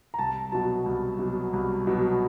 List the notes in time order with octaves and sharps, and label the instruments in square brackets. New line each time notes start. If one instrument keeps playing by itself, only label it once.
[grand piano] A#5
C2 A5
B2 F#3 A5
C2
B2 F#3
C2
B2 F#3